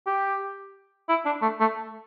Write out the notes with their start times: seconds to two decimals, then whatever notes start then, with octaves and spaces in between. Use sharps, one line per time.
0.06 G4
1.09 E4
1.25 D4
1.42 A3
1.60 A3